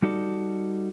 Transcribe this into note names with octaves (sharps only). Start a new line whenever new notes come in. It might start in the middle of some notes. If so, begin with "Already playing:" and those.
G3 D#4 F#4 A4 D5